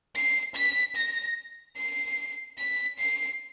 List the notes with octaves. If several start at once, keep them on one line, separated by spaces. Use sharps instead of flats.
C7
B6
A#6
C7
B6
C7